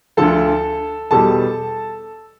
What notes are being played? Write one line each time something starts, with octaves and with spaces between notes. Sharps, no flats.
D2 D3 F3 A4 A5
E2 B2 G3 A4 A5